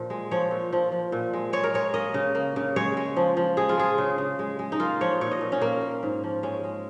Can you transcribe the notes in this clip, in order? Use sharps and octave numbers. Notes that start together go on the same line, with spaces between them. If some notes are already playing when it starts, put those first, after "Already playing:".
Already playing: A#2 F3
G#3
F3 C#5
A#2
F3
F3
A#2
G#3
G#3 C#5
A#4
G#3 C#5
A#3 D#5
C#3
A#3
C#3
G#3 C#5
G#3
F3
F3
G#3 G#4
F4
G#3 G#4
C#3
C#3
G#3
G#3
D#4
A#3 F4
F3 C#5
A#2 C#5
D#5
A#2
C#4
A#2 A#3
A#3
G#2
F3
G#3 C#4
G#3